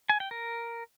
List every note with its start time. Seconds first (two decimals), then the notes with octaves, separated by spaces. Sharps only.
0.09 G#5
0.20 G5
0.31 A#4